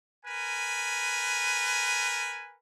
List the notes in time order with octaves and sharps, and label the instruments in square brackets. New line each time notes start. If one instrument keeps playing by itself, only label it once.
[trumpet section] A#4 B4 G#5